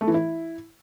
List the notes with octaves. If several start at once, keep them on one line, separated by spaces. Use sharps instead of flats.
A3
E3
E4